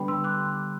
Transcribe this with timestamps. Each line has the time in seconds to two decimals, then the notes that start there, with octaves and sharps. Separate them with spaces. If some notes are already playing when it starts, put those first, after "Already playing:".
Already playing: D3 G3 B3 G5 B5
0.08 C6 E6
0.24 D6 F#6